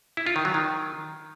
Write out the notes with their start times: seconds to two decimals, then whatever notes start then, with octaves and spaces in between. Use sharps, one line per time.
0.17 E4
0.27 F4
0.36 D#3
0.45 F#3
0.54 D#3